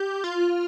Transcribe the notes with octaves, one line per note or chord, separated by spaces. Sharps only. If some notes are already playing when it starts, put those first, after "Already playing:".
Already playing: G4
F4